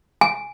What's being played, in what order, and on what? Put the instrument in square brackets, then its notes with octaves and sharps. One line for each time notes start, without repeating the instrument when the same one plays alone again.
[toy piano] G#5